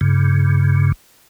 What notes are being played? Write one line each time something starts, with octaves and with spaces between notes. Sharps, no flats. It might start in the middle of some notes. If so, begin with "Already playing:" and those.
G2 C#3